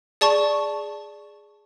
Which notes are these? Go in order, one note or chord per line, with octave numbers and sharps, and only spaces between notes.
G#4 D5 A5 C#6